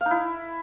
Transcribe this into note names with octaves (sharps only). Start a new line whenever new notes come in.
F5
D#4
E4